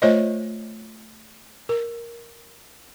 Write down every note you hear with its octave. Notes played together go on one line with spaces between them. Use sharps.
A3 F4 C5 C#5 D#5
A#4